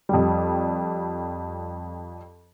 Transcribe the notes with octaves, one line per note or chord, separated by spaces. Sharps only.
F2 G3